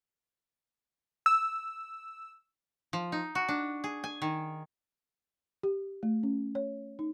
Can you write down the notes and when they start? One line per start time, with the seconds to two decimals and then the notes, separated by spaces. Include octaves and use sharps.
1.26 E6
2.93 F3
3.12 D#4
3.35 F#4
3.48 D4
3.84 G#4
4.04 G#5
4.22 D#3
5.63 G4
6.03 A3
6.23 C#4
6.55 C#5
6.99 D#4